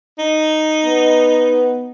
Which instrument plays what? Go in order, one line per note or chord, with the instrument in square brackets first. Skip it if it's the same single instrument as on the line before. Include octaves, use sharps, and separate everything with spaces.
[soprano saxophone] D#4
[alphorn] B3